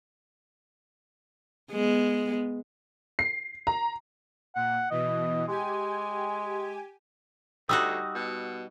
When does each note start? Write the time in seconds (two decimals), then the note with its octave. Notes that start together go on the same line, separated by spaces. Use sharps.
1.72 G#3 B3
3.19 C7
3.67 A#5
4.56 A#2 F#5
4.91 B2 E3 D#5
5.48 G#3 G4 G#5
7.69 D2 G3 D#4 F#4 D#6 E6
8.15 B2